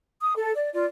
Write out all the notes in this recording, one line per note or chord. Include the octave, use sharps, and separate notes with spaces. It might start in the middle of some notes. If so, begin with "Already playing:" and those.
D#6
A4
D5
F4 D5